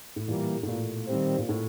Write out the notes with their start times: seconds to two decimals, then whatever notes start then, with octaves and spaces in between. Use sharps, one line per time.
0.16 A2
0.27 A#2 E3 G3 A#3
0.63 A2
0.68 A#2
1.08 D#3 G3 C4
1.38 A#2
1.49 A2